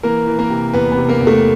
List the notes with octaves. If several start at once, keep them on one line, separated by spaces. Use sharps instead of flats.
E3 A#3 A#4
E3
A#3 A#4
C3
E2 B3 B4
B3 B4
C3
A#3 A#4
E2
A3 A4